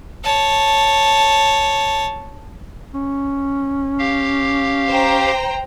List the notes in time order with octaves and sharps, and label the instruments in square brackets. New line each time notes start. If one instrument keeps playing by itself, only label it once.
[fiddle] C#5 A5
[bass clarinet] C#4
[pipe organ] G4 F5
[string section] C5 G5 A#5